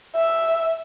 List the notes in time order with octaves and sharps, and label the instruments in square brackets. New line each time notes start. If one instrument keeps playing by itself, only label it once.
[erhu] E5